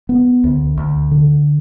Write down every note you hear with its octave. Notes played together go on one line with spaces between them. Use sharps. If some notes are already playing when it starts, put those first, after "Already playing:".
B3
D2
D2
D3